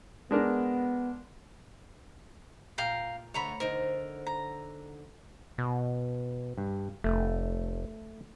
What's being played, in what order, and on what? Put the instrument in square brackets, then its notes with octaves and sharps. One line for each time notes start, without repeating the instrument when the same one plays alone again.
[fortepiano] G#3 D4 A#4 [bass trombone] B3
[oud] A#2 [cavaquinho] F5 G5 A#5
[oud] D2 D3 [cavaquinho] C#5 A#5 B5
[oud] D3 D#4 C5 [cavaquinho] A#4
[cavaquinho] A#5
[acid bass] B2
[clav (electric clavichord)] G2
[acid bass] F1 [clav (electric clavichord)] A3